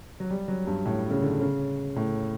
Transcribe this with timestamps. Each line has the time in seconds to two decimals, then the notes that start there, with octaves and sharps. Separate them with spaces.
0.20 F#3
0.30 G3
0.48 F#3
0.67 G2
0.86 A2
1.10 C#3
1.22 D3
1.41 C#3
1.96 A2